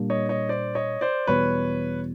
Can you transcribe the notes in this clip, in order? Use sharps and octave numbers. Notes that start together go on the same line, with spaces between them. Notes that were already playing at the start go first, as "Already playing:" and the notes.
Already playing: A#2 G3 A#3 D4
C#5 D#5
C#5 D#5
C5 D5
C#5 D#5
C5 D5
E2 B2 G3 B4 C#5